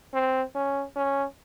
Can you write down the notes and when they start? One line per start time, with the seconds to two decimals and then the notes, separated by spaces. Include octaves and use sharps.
0.14 C4
0.55 C#4
0.96 C#4